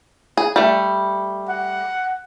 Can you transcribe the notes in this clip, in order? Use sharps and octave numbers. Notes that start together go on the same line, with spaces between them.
G#4
G3 A3
F#5